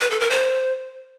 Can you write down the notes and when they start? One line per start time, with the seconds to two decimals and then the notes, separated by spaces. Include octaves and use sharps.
0.01 B4
0.10 A4
0.20 A#4
0.30 C5